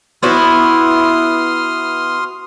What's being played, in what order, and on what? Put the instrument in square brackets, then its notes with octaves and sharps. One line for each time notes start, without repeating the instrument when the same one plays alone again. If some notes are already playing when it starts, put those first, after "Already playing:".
[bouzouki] B3 E4 F#4 [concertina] C6 D#6 F6